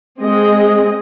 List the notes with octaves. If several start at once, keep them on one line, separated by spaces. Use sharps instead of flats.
G#3 C4 G#4 D#5